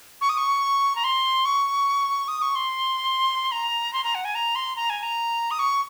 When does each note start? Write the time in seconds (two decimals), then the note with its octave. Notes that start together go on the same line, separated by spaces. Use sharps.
0.21 C#6
0.29 D#6
0.37 C#6
0.96 A#5
1.04 C6
1.45 C#6
2.28 D#6
2.42 C#6
2.55 C6
3.52 A#5
3.93 C6
4.04 A#5
4.15 F#5
4.25 G#5
4.35 A#5
4.55 C6
4.76 A#5
4.90 G#5
5.03 A#5
5.51 D#6
5.59 C#6